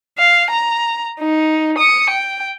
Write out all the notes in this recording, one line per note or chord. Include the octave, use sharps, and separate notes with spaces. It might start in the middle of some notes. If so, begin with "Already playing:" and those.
F5
A#5
D#4
D#6 C#7
G5